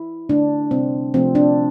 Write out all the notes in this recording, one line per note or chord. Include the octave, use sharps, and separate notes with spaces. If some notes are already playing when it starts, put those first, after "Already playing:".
Already playing: E4
D3 A3 D4
C3 G3 C4
C3 F3 A3 C4
D4